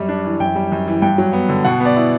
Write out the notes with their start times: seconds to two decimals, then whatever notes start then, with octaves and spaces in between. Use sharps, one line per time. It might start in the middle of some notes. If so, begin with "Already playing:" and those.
Already playing: F#2 G3
0.09 D4
0.25 E3
0.40 F#2 G5
0.55 G3
0.72 F#2
0.87 E3
1.02 G2 G5
1.18 F#3
1.33 B3
1.49 D3
1.64 B2 F#5
1.80 B3
1.85 D5
1.96 E4